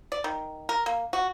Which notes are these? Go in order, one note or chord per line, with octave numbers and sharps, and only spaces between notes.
D5
D#3
A#4
A#3
F#4